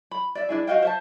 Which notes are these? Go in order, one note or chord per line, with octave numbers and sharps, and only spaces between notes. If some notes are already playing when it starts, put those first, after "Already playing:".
B5
D5 E5
D4 E4 G#4
F#4 D#5 F5 G5
C5 E5 A5